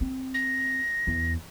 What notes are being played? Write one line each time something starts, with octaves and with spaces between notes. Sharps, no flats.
C4
A#6
E2